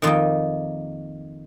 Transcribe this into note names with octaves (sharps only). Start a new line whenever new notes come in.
F2 D#3 A#3 D#4 F4